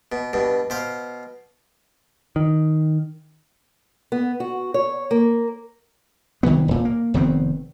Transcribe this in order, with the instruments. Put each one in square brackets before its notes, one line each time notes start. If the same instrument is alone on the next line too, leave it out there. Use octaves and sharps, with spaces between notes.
[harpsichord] B2
G2 B2
B2 C5 F5
[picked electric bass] D#3
[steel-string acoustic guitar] B3
F#4
C#5
A#3
[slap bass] C2 D#3 E3 B3
D#1 A#2
A#3
F1 D#3 B3 C4